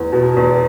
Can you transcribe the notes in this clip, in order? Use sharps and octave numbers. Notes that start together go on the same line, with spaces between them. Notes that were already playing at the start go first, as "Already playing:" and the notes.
Already playing: E2
B2
E2